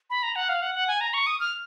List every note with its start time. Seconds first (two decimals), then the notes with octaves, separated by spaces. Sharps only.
0.10 B5
0.23 A#5
0.36 F#5
0.49 F5
0.62 F#5
0.75 F#5
0.88 G#5
1.01 A#5
1.14 C#6
1.27 D#6
1.40 F6